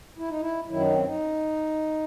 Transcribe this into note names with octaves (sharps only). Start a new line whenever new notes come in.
E4
D#4
E4
F#2 D#3 F#3 E4
D#4
C4
D#4